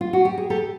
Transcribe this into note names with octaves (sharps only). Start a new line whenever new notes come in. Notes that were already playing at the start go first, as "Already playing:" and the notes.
F4
F#4
G4
G#4
G4 A4